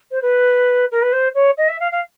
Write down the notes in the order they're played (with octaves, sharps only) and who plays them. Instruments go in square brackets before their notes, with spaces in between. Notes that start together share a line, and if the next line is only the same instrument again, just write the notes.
[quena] C5
B4
A#4
B4
C5
C#5
D#5
E5
F5
F5